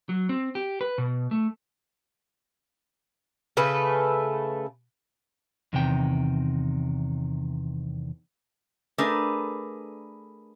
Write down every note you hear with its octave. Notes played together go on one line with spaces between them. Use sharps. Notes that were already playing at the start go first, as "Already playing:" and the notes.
F#3
C4
G4
B4
B2
A3
C#3 A3 A4 B4
E2 C3 D#3 G5
A3 D4 G#4 A#4 B4